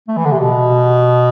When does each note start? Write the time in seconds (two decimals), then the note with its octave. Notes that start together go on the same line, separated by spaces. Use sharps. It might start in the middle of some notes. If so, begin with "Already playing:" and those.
0.08 A3
0.17 E3
0.25 D3
0.31 C3
0.39 B2